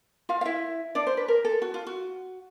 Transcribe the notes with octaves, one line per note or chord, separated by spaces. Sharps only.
F4 F5
F5
E4 E5
D4 D5
C5
B4
A#4
A4
F#4
F4
F#4